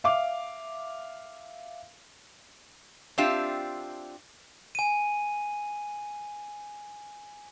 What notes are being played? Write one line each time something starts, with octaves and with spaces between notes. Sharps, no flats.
E5 F5 D6
C4 D4 F4 G4 E5
G#5 D#7